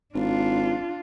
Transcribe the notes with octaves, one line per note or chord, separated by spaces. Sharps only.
G#1 D4 F4